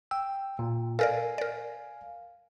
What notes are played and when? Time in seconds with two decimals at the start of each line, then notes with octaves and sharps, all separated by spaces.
0.11 G5 E6
0.59 A#2
0.99 A4 A#4 D5 F5 G#5
1.38 A#4 D5